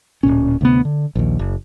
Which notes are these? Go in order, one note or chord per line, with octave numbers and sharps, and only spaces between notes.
D1 C2 A#2 C#4
D2 C3 B3
D3
A#1 D#2
F#1